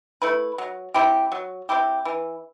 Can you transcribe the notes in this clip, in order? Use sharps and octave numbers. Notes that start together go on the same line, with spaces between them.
A3 E4 B4
F#3
C4 E4 G4
F#3
C4 E4 G4
E3